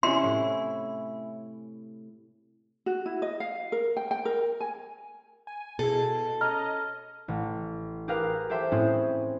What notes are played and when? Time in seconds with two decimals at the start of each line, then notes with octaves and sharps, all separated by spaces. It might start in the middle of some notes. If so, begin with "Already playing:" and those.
0.03 C3 C#4 E4 C6
0.23 A2
2.86 F#4
3.06 E4
3.22 D#5
3.40 F5
3.72 A#4
3.97 G5
4.11 G5
4.25 A#4
4.60 G#5
5.47 G#5
5.79 B2 E4 G#4 A4
6.41 C#4 C#5 D#5 A#5 F6
7.28 A1
8.08 G4 G#4 A#4 B4 F5
8.50 G4 A4 C5 E5 G5
8.72 A2 C4 C#4 E4 G#4